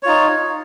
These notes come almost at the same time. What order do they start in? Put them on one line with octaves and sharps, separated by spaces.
C#5 F4 D#4